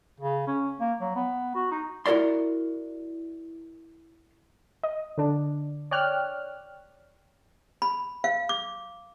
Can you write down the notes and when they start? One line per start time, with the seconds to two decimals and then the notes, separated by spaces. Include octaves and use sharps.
0.20 C#3
0.47 C#4
0.80 A#3
1.01 F#3
1.15 B3
1.55 F#4
1.71 D#4
2.06 E4 F#4 A#4 D5 C6
4.83 D#5
5.18 D3 D4
5.91 C#5 D5 G5 F6 F#6
7.82 B5
8.24 F5
8.49 D6